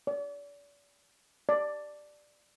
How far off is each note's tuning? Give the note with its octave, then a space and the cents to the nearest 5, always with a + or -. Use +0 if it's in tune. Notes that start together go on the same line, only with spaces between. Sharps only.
D5 -40
D5 +10